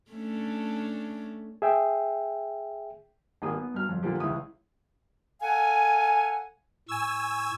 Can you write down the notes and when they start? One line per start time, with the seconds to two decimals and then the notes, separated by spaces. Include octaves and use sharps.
0.11 A3 C#4 D4
1.62 G#4 E5 G5
3.42 G#1 A#3 G4 A#4 G#5 D#6
3.53 B3
3.74 G2 F#3 F6
3.89 F2
4.03 A#2 D3 F3 A#3 G4
4.20 C#2 E3 G#3 E4 D#6
5.41 A4 F5 F#5 G#5
6.88 A2 G#5 C#6 E6